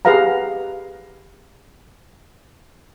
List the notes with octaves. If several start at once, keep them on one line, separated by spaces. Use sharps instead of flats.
G4 G#4 B4 F5 F#5 A#5